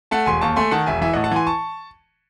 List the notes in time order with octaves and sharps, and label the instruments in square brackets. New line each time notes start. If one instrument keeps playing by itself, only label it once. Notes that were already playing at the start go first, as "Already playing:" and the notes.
[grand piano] A3 F#5 A5
E1 G#5 C6
D#2 A5 C#6
A3 G#5 C6
D#3 F#5 A5
E1 E5 G#5
E3 E5 G#5
D#5 F#5
A2
F#5 A5
E3 G#5 C6
A5 C#6